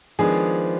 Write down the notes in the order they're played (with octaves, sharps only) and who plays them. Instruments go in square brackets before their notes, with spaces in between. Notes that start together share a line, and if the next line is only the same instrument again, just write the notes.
[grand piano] D#3 G#3 B3 D4 G#4 [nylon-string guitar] F3